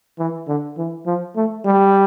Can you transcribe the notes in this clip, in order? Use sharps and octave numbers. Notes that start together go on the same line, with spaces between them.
E3
D3
E3
F3
A3
G3